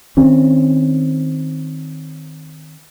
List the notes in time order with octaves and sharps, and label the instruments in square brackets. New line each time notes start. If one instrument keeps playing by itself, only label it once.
[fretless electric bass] D#3 C4 C#4